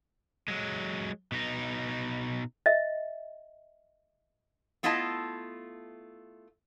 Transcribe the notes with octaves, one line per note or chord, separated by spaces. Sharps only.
F#3 G#3
B2 D#4
D#5 E5
A3 B3 E4 F4 D#5 A5